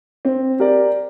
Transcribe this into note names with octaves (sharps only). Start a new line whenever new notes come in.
C4
G4 A#4 D5